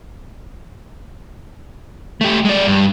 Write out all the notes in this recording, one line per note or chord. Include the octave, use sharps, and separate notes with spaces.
A3 G4
G#3 D5
G2